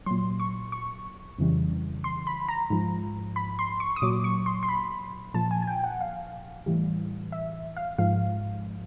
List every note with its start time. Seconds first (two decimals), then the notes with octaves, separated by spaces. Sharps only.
0.06 A#2 F#3 C6
0.40 C#6
0.72 C#6
1.38 F2 C#3 E3 G3
2.04 C6
2.27 B5
2.48 A#5
2.70 G#2 F3
3.36 B5
3.59 C6
3.80 C#6
3.96 D#6
4.02 A#2 F#3 D6
4.24 C#6
4.46 C6
4.63 C6
4.69 B5
5.34 A#2 F3 A5
5.51 G#5
5.62 G#5
5.67 G5
5.84 F#5
6.01 F5
6.66 A2 E3 G3
7.32 E5
7.76 F5
7.98 G#2 F3 F5